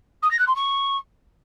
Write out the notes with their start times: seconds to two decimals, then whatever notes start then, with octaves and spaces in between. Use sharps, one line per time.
0.22 D#6
0.30 A#6
0.39 F#6
0.47 C6
0.55 C#6